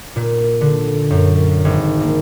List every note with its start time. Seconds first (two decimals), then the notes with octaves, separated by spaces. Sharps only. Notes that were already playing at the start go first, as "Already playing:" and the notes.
0.16 A#2
0.61 D3
1.10 F#2
1.65 G#1
2.01 A#3